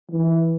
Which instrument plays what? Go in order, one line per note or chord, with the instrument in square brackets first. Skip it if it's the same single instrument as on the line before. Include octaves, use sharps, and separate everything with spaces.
[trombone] E3